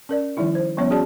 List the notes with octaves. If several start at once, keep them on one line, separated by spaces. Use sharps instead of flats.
C#4 A#4 D5
D#3 F3 G3 D#4 E4
C5
F3 G3 B3 C#4 C#5
C#4 F#4 G#4 D5 A5